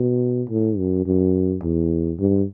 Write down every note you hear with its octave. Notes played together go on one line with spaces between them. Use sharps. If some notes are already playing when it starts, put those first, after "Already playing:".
Already playing: B2
A2
F#2
F#2
E2
G2